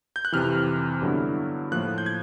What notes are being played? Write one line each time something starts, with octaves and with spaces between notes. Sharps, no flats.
G6
F#6
F2 C3 E3 F6
G2 D3 F#3 B3 E4
A2 F3 A#3 F#6
G6
G#6